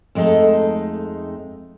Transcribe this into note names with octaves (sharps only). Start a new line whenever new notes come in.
F2 G#3 A3 D#4 A4